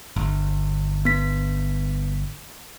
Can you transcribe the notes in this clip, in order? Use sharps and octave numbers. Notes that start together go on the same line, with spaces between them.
G1
B3 B6